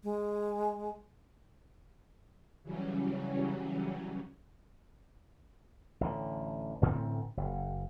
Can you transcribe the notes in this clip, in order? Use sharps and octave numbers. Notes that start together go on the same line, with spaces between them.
G#3
C#3 E3 F#3 G3 C#4
A1 D3
A1 A2 D3 C4
F#1